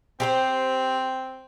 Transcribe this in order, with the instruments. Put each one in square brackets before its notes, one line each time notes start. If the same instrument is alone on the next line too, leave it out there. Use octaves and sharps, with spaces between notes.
[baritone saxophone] C4 [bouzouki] G4 G#4 C5